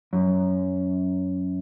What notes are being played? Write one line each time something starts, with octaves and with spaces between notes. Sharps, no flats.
F#2